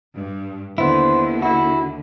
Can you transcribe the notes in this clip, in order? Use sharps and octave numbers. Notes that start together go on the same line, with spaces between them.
G2
D#2 D3 B3 E4 C5
E4 F#4